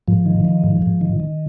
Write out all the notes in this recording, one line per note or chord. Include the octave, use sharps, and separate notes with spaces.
G#2 F3
D#3
D#3
G#2
G#2
D#3
D#3